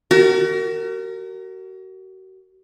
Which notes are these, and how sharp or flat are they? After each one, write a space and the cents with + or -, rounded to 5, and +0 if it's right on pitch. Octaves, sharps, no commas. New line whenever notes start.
F#4 +35 A#4 -20